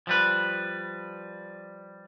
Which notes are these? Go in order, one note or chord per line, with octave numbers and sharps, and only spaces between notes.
F3 G3 B4